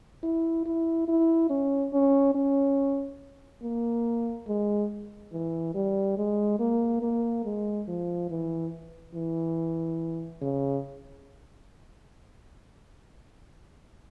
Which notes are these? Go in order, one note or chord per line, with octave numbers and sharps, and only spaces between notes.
E4
E4
E4
C#4
C#4
C#4
A#3
G#3
E3
G3
G#3
A#3
A#3
G#3
F3
E3
E3
C#3